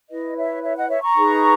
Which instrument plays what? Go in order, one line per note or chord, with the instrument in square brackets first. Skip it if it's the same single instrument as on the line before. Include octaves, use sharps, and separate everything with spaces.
[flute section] E4 B4 D#5
C#5 E5
C#5 E5
D#5 F#5
C#5 E5
A#5 C#6
D#4 G#4 B4